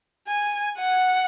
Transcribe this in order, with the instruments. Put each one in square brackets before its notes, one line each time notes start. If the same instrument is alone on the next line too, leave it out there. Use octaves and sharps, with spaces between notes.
[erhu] G#5
F#5